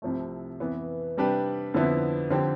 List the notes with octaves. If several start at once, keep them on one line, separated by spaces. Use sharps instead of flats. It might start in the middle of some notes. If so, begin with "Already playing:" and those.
C2 C3 F3 A3
F2 E3 B3
C3 G3 D4 G4 B4
F2 D3 F3 B3 E4
D3 F3 C4 G4